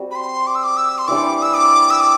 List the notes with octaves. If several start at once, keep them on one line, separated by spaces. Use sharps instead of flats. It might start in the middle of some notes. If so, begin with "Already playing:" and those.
Already playing: G3 C4 F#4
B5
C6
D6
E6
D6
E6
C6
E3 G3 D4 D6
E6
D6
E6
D6